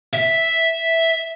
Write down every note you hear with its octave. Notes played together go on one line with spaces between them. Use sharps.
E5